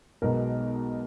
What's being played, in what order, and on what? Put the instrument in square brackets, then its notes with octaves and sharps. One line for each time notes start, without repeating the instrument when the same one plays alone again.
[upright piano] B1 B2 G#3 B3 A#4